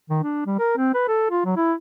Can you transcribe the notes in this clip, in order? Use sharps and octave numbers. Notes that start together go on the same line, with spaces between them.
D#3
D4
G3
A#4
C4
B4
A4
F4
F#3
E4